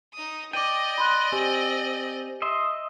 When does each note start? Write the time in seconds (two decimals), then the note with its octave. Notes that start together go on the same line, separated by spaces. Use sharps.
0.14 D#4 D#6
0.53 D5 D#5 G5 D6 D#7
0.98 B5 C6 F#6
1.32 C4 G4 G#5
2.42 D#5 E5 C6